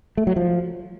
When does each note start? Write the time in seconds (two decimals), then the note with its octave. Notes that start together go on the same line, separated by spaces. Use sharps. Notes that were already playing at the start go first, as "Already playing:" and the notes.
0.17 A3
0.27 F#3
0.36 F3